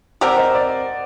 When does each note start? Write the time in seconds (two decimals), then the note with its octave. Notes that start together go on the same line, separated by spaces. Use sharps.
0.21 C4 G4 A#4 D5 F#5
0.38 C5 D#5
0.55 D5